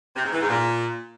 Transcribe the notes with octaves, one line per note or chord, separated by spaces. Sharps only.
C3
G#2
E3
G#2
A#2